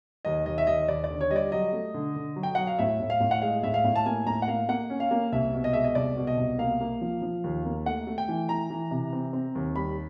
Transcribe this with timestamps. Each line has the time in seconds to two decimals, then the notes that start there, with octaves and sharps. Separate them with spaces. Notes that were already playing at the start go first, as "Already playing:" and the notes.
0.25 D#2 D#5
0.46 D#2 D#5
0.58 E5
0.67 D#2 D#5
0.88 D#2 D5
1.04 D5
1.10 D3
1.21 C#5
1.30 G3 D#5
1.36 D5
1.52 F#3 D#5
1.73 A3
1.94 D3
2.16 D3
2.36 F#3
2.43 G5
2.55 F#3 F#5
2.67 F5
2.79 A2 E5
3.00 A2
3.10 F5
3.20 A2
3.31 F#5
3.42 G#3 F5
3.63 A2 E5
3.74 F5
3.84 A2
3.96 A5
4.06 A#3 G#5
4.26 A2 A#5
4.42 F#5
4.48 A#3 F5
4.68 A#3 F#5
4.90 C#4
5.00 F5
5.11 A#3
5.32 C2 E5
5.53 B2
5.64 D#5
5.73 G#3 E5
5.84 D#5
5.95 C2 D5
6.17 B2
6.27 D#5
6.38 C2
6.59 A#3 F5
6.80 A#3
7.01 F3
7.22 F3
7.44 D#2
7.65 A#3
7.86 A3 F#5
8.07 A3
8.18 G5
8.28 E3
8.49 E3 A#5
8.70 E3
8.91 C3
9.13 C4
9.33 C4
9.55 D#2
9.76 G3 B5